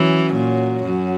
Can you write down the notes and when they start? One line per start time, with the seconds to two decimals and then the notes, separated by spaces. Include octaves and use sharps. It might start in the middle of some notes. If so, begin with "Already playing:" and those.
Already playing: E3 F#3 C#4 F#4
0.34 A#2
0.84 F#2